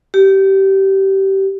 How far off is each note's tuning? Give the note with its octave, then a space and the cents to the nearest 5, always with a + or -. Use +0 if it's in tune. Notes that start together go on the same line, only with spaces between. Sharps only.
G4 -20